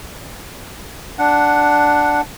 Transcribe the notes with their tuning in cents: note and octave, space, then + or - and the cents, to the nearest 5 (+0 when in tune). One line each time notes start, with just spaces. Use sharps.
D4 +0 F#5 +0